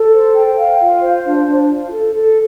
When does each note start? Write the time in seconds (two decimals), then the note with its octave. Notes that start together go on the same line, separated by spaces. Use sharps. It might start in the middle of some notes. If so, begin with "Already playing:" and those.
Already playing: A4
0.13 C5
0.35 G5
0.58 F5
0.80 F4
1.02 C5
1.25 D4
1.46 D4
1.68 F4
1.91 A4
2.14 A4